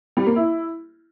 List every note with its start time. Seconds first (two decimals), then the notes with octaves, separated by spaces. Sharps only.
0.17 G3
0.26 A#3
0.36 E4